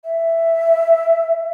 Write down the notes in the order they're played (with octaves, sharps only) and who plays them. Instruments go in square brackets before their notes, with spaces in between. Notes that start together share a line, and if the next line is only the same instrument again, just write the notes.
[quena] E5